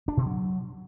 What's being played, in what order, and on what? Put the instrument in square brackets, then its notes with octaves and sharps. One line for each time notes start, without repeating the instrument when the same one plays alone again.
[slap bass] D4
B2
F#3